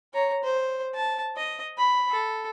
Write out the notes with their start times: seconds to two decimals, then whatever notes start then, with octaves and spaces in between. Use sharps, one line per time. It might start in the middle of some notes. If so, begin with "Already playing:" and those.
0.14 C#5 A#5
0.44 C5
0.94 A5
1.37 D#5
1.78 B5
2.10 A4